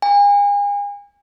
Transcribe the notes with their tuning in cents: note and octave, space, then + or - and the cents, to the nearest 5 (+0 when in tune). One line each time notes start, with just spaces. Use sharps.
G#5 -40